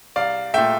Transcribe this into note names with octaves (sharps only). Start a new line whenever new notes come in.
C2 D5 F5
A#2 A3 E5 G5